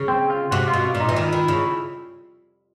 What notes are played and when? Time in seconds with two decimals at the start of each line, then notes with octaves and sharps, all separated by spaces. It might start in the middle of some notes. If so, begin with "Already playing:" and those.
Already playing: C#3
0.08 C4
0.30 F4
0.51 C3 F#4
0.68 F4
0.73 B2
0.84 F4
0.95 A#2
1.00 D#4
1.09 E3
1.16 D#3 E4
1.33 D#3
1.48 C#3